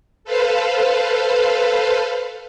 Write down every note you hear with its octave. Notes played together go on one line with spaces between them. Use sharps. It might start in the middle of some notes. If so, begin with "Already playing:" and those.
A4 B4 C5 F5